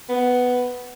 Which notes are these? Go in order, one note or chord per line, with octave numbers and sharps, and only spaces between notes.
B3